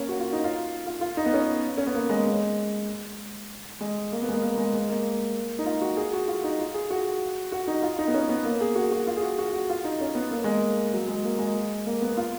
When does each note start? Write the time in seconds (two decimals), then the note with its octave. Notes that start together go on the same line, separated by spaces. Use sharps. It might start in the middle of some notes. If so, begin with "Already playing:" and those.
Already playing: A#3 C#4
0.09 F#4
0.20 F4
0.33 D#4
0.44 F4
0.86 F4
1.01 F4
1.17 D#4
1.25 B3
1.33 C#4
1.78 C#4
1.86 B3
1.94 A#3
2.10 G#3
2.26 G#3
3.81 G#3
4.12 A#3
4.22 B3
4.29 G#3
4.32 A#3
4.42 A#3
4.58 G#3
4.73 G#3
4.89 A#3
5.59 D#4
5.66 F4
5.82 F#4
5.97 G#4
6.13 F#4
6.28 F4
6.44 D#4
6.60 F4
6.74 G#4
6.90 F#4
7.52 F#4
7.68 D#4
7.83 F4
7.99 D#4
8.08 B3
8.14 C#4
8.29 B3
8.44 A#3
8.61 G#4
8.76 F#4
8.92 F#4
9.07 F4
9.17 G#4
9.22 F#4
9.39 F#4
9.53 F#4
9.70 F4
9.84 D#4
10.01 C#4
10.15 B3
10.31 A#3
10.44 G#3
10.58 A#3
10.93 F#3
11.08 G#3
11.24 A#3
11.39 G#3
11.86 A#3
12.02 B3
12.17 F4